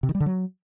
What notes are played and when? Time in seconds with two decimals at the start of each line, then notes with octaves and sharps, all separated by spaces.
0.03 C3
0.09 D#3
0.15 G3
0.20 D3
0.26 F#3